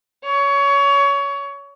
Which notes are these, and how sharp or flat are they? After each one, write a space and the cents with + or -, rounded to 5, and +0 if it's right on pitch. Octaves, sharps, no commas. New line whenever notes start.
C#5 +20